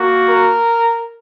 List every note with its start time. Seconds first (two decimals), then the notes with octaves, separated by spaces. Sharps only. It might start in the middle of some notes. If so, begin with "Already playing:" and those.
Already playing: A#3 F#4
0.29 A#4